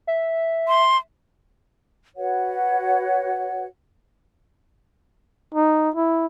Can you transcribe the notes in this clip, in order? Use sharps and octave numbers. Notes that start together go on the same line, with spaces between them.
E5
C6
F#4 B4 C#5 F#5
D#4
E4